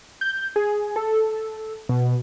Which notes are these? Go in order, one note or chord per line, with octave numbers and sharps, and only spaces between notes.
G6
G#4
A4
B2